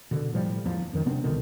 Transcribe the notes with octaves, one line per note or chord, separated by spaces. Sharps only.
B2 D3
A2 F3 G3
D1 E2 F3
F#2 D#3
C3 B3 C4 D4
C2 B2 D3 D#3